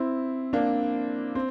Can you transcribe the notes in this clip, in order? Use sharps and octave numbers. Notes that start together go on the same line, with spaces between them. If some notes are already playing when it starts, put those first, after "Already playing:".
Already playing: C4 E4
A#3 D4
C4